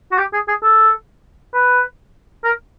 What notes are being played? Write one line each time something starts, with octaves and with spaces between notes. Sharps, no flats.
F#4
G4
G#4
G#4
A4
B4
A#4